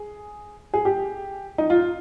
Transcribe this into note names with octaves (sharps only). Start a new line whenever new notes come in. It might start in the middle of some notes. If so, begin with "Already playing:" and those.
Already playing: G#4
G#4
G4
D#4
F4